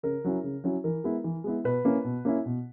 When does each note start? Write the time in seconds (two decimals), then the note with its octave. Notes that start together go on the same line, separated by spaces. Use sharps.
0.03 C#3 A#4
0.24 F#3 C#4 E4
0.44 C#3
0.64 F#3 C#4 E4
0.84 E3 A#4
1.04 G#3 B3 E4
1.24 E3
1.44 G#3 B3 E4
1.64 B2 B4
1.85 A#3 C#4 E4
2.04 B2
2.25 A#3 C#4 E4
2.46 B2